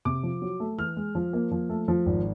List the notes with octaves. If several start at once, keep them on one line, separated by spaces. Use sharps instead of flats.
C3 D6
F3
F#3
A3
E3 F6
G#3
F3
A#3
F3
A3
F3
G#1